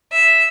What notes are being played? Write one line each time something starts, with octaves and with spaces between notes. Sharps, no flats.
E5